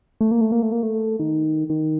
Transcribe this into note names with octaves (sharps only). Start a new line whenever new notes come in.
A3
A#3
A3
A#3
A3
A#3
A3
D#3
D#3